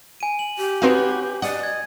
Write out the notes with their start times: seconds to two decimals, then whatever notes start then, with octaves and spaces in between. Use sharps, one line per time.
0.20 G#5 D#7
0.39 F#7
0.58 G4
0.82 C4 D#4 F#4 B4 C#5 F5
1.42 D5 D#5 F#5
1.63 G#6